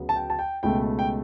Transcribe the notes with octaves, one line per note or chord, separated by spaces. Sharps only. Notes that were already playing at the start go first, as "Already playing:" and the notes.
Already playing: D2 C#3 F#3 B3
A5
G5
A5
G5
C#2 B2 A3 G5
G5